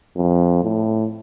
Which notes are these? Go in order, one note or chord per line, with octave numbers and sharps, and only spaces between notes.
F2
A2